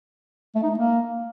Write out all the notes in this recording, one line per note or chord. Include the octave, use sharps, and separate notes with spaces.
A3
D#4
A3
A#3